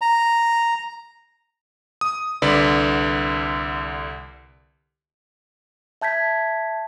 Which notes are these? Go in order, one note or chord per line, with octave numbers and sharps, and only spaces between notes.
A#5
D#6
C2 D3 B4 D5
E5 A5 G6 G#6 B6